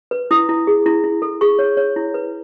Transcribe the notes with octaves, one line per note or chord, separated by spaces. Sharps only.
B4
E4 D#6
E4
G#4
E4
E4
A4
G#4 C#6
C#5
C#5
E4
B4